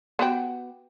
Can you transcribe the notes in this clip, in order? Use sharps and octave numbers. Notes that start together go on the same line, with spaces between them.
B3 F#4 G4